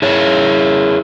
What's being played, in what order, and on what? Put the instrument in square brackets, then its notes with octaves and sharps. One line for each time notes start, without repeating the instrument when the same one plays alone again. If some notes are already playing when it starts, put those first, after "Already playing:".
[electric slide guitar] E4 G#4 C#5